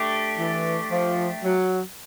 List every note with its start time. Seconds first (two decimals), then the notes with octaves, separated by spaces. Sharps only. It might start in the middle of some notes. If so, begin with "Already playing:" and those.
Already playing: A3 D4 G4
0.38 E3
0.91 F3
1.43 F#3